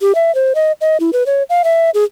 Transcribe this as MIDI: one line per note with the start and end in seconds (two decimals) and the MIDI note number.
0.01 0.15 67
0.15 0.34 76
0.35 0.53 72
0.55 0.72 75
0.81 0.97 75
1.00 1.10 64
1.13 1.26 71
1.26 1.43 73
1.50 1.62 77
1.64 1.90 76
1.94 2.04 68